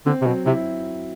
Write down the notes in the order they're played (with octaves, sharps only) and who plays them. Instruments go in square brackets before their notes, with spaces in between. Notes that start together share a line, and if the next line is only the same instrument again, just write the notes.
[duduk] D3 [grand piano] C4
[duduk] C3
[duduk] B2 [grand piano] F#3
[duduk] C3 [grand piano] E4